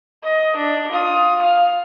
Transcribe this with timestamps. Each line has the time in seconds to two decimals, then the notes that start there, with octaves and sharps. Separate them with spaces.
0.24 D#5
0.56 D4
0.91 F4 D#6
1.42 F5